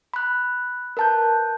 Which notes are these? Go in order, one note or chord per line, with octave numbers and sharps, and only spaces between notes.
B5 F#6
A#4 B4 A5 F#6 G6